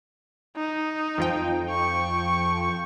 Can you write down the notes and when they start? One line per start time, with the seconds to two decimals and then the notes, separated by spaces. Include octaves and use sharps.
0.57 D#4
1.18 F2 F3 G5
1.70 C#6